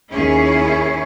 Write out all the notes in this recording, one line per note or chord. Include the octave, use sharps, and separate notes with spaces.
D#2 C#4 E4 G#4 C#5